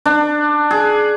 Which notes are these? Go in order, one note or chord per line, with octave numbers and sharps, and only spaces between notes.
D4
G#4